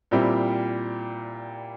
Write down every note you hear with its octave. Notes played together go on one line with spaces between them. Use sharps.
A#2 G3 C4 E4 G4